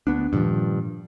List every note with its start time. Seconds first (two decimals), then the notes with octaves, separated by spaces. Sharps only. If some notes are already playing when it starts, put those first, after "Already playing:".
0.07 D2 B3 D4
0.33 G2 A#2 D#3 F3